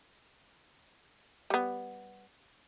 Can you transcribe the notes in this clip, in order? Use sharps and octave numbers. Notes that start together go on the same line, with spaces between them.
G3 B3